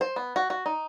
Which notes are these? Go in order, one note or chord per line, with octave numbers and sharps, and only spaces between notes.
C5
B3
F#4
F#4
D#4